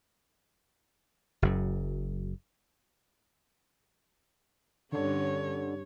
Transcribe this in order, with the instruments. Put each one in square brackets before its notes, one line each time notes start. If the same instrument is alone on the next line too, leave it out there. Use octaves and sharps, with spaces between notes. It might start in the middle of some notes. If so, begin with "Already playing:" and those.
[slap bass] F#1 F#2
[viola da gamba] G2 C#4 [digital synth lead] D3 [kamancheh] C#5